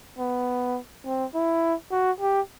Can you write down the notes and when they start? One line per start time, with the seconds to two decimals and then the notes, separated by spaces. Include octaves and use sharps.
0.19 B3
1.05 C4
1.34 E4
1.92 F#4
2.21 G4